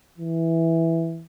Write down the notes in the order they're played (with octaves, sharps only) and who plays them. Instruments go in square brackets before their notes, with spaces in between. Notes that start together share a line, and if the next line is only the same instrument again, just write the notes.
[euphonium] E3